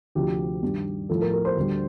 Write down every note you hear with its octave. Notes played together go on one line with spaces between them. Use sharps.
D2 C3 F3 G4
G2 D#3 G3
A2 F3 A4
A#4
A#4
C5
D2 D3 G3